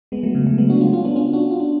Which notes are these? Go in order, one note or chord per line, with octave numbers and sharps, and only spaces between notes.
G#3 B3
F#3 A3
C#3
F#3 A3
G#3 B3
D4 F#4
C#4 F4
C#4 F4
B3 D4
C#4 F4
D4 F#4
F4
D4